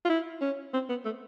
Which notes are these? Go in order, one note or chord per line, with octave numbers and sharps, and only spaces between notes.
F4
E4
C#4
C4
B3
A3